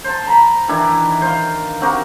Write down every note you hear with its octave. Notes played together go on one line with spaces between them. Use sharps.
C5 A5
A#5 B5
D#3 E3 D4 E4
C5 F5
C4 F#4 G4 A#4